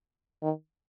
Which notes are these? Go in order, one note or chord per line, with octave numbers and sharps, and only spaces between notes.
D#3